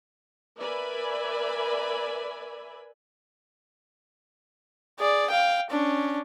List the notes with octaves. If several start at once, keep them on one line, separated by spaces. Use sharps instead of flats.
A#4 B4 D5 E5 G#5 B5
G#4 D5
F5 G5
C#4 D4